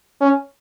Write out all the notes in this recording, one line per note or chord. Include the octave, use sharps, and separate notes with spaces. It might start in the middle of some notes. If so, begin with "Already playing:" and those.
C#4